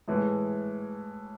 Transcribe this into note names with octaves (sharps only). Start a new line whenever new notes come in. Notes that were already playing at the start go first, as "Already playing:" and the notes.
A2 E3 G#3